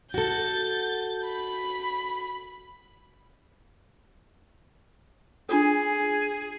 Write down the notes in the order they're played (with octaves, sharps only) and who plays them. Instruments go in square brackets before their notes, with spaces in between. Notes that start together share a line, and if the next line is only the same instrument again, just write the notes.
[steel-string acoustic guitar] F#4 A4 [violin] G6 A6
[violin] B5
[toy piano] D4 F4 A4 [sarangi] G#4